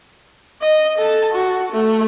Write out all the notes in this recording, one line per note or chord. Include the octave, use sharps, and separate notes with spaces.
D#5
A4 A5
F#4
A3